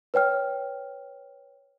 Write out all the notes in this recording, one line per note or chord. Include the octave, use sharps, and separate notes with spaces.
B4 C#5 G5 F6